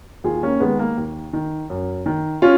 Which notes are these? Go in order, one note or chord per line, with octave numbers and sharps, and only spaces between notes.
D#2 F4 G#4
A#3 C#4
D#3 G#3 B3
A#3
D#2
D#3
F#2
D#3
C#4 F4